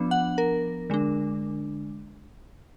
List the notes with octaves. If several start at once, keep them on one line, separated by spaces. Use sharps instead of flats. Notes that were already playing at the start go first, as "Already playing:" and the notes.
Already playing: F3 B3 D4
F#5
A#4
D3 G#3 D4